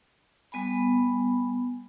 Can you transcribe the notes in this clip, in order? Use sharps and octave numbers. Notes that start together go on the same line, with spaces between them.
G3 B3 G#5 B5